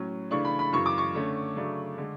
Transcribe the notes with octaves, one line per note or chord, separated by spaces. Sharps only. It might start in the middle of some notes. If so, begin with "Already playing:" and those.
Already playing: A2 F#3 C#4
C#3 E3 A3 D4 C#6
B5
B5
F#2 C#3 E3 C#6
D6
C#6
D3 A3 C#4
C#3 F#3 A3 D4
D3 G#3 D4